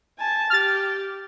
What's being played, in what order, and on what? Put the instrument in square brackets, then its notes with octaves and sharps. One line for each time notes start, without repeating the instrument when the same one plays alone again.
[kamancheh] G#5 A5
[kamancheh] G4 [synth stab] F6 A6